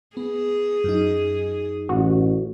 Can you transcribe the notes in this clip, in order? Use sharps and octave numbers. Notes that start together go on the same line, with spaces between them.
B3 G#4
F#2 D#4
A1 F#4